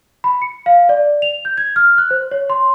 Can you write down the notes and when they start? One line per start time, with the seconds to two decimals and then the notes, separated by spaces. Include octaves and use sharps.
0.24 B5
0.42 C#7
0.66 F5
0.89 D5
1.22 F7
1.45 G6
1.58 G#6
1.76 F6
1.98 F#6
2.11 C5
2.31 C#5
2.50 C6